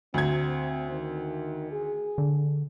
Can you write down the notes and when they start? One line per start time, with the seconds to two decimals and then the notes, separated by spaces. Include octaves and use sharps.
0.14 D2 C4 G#6
0.91 D#3
1.72 G#4
2.18 D3